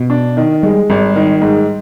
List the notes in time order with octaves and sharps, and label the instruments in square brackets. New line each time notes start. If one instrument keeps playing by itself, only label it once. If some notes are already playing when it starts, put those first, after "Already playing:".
Already playing: [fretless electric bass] B2
[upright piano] D4
D#3
[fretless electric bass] G3 [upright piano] G#3
[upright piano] G#1 [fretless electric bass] G3
[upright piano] D#3
G#2